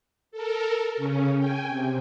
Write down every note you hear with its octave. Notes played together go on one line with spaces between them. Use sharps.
A4 A#4
C#3 C#4
G5 G#5
C3